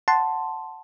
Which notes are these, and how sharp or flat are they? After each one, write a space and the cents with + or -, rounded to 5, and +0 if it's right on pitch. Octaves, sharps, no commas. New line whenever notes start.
F#5 +0 A5 +0 C6 +0